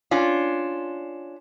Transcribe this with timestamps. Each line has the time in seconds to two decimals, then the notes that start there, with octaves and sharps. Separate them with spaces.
0.11 C#4 D4 F4